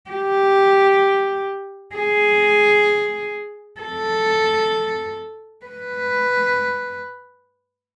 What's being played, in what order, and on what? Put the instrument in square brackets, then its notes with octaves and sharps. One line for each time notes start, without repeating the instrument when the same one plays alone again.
[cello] G4
G#4
A4
B4